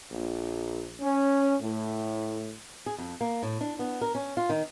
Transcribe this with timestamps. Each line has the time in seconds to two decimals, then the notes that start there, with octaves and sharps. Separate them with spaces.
0.11 A#1
1.01 C#4
1.61 A2
2.86 G#4
2.98 F2
3.21 A#3
3.43 A2
3.61 D4
3.79 B3
4.01 A#4
4.15 C#4
4.37 F4
4.49 D#3